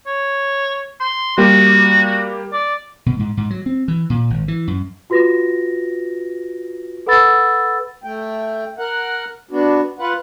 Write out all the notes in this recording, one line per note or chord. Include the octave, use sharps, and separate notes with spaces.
C#5
C6
G3 A#3 F#4 G4
D5
B2
G#2
G#2
F#3
C4
E3
A#2
G#1
E3
F#2
F4 F#4 B4 A#6
A4 B4 F#5 B5 E6 A6
A3 G5
A#4 F#5
B3 D4 F#4
F4 B4 F#5